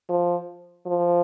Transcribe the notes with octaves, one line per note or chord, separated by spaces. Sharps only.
F3
F3